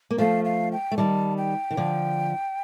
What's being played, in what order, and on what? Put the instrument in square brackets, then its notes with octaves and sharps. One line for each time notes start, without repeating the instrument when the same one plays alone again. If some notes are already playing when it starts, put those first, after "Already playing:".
[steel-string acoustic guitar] A#3
[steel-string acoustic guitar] F3 A3 [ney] F5
[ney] F5
G5
[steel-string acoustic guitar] A3
[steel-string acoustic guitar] D#3 G3 [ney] A5
[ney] G5
[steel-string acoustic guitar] D#3
D3 F3